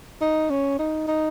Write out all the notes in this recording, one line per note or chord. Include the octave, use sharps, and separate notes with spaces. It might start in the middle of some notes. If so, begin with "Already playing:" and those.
D#4
C#4
D#4
D#4